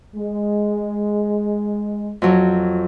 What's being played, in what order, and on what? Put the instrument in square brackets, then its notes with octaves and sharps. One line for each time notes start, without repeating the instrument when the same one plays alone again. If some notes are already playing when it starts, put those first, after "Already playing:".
[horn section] G#3
[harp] F2 F#3